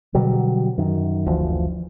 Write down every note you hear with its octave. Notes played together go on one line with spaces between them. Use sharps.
B2 D3 F#3 G3
F#2 D#3
F#1 D2 E3 F3